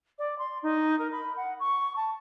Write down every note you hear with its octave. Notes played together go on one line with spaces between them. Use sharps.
D5
C6
D#4
A#4
B5
F#5
C#6
A5